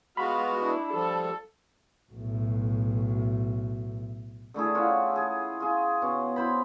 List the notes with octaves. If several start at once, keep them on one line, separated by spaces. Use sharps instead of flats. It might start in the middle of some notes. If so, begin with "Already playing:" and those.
G#3 B3 F4 F#4 F5 B5
D4 E4
F3 G3 A4
B1 A2
D3 A3 E4 G#4
C#4 E4 F4 F#5
G#4
F4 G#4
B2 C#4
E4 C5 B5